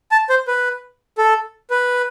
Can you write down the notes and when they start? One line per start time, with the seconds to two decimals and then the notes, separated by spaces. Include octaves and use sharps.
0.11 A5
0.29 C5
0.47 B4
1.18 A4
1.70 B4